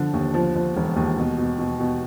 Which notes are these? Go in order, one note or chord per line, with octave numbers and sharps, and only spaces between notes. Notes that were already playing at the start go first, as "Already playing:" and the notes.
Already playing: D3 F3
D#2
F3
F3
E1
D#2
B2
B2
B2
B2